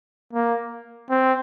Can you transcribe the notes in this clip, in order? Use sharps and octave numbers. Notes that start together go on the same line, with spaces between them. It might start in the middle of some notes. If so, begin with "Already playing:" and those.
A#3
C4